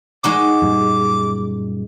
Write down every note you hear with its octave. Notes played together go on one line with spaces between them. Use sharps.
G#3 D#4 F#4 D6
F#2 A#2 G3